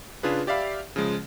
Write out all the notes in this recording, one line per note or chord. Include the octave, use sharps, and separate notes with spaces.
C#3 D4 F4 G#4 B4
G4 D5 E5 F5 B5
C#3 F3 G#3